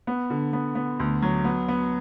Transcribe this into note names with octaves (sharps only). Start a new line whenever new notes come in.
B3
D3
B3
B3
D2
F#3
B3
B3